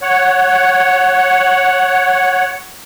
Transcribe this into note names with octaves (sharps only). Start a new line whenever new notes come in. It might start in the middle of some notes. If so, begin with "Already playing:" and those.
C#5 F#5